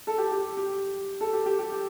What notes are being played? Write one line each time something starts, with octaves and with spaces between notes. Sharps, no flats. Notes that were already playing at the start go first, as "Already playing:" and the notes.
A4
G4
G4
G4
A4
G4
G4
G4
G4